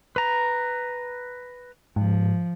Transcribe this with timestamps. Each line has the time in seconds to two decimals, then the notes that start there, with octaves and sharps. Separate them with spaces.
0.16 B4 A#5
1.96 G#2 F3